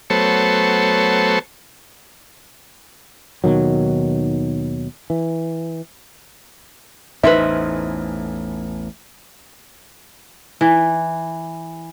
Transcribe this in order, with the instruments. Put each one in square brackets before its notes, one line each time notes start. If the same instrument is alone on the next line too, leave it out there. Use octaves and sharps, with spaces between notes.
[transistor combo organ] F#3 A3 B3 A4 C5 C#5
[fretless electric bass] D#2 B2 D#3 F#3
E3
[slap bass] A1 E2 A2 [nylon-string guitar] D#4 C5 [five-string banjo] B4 E5
[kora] E3